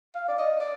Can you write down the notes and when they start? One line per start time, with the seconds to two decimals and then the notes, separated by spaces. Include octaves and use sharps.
0.15 F5
0.28 D5
0.38 D#5
0.60 D5